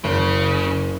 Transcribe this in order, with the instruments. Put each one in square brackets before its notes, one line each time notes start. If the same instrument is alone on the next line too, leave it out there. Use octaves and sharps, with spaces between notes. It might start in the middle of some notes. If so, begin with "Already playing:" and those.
[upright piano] F#1 [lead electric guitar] C#3